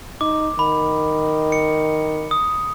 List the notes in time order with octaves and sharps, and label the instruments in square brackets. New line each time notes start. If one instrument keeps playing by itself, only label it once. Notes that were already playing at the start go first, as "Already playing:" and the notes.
[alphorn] D#4 [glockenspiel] D6
[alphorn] D#3 [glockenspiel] B5
[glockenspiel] C#7
D#6